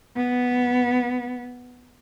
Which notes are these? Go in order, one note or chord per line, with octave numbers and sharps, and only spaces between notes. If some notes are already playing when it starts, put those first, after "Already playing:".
B3